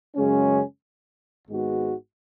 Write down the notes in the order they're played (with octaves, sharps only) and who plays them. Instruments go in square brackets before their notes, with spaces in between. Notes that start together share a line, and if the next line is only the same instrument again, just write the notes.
[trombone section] F#2 C#3 G#3 C#4
G#1 G#2 G#3 B3 F#4